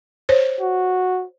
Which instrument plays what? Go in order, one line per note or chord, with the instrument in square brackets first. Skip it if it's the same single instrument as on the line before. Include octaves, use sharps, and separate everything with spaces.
[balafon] C5 C#5
[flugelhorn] F#4